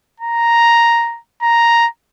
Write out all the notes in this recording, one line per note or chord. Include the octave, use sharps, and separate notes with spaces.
A#5
A#5